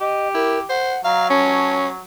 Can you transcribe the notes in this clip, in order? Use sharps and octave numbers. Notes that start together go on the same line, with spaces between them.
G4 D#5
E4 A#4
C5 F#5
F#3 F5 A#5
C#4 A5